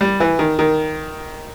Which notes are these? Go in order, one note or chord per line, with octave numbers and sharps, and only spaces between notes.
G3
E3
D#3
D#3